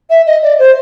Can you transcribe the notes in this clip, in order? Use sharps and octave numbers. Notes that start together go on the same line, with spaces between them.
E5
D#5
D5
C5